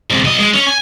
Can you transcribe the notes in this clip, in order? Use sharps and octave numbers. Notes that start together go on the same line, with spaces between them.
C3 G#3
B1 D#5
G#3
C#4
G#5